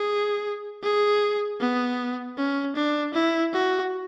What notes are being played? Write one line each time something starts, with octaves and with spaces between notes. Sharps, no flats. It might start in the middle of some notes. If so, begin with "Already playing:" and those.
Already playing: G#4
G#4
B3
C#4
D4
E4
F#4